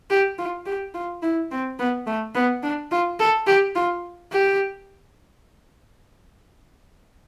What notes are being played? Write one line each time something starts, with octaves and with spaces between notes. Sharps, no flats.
G4
F4
G4
F4
E4
C4
B3
A3
B3
D4
F4
A4
G4
F4
G4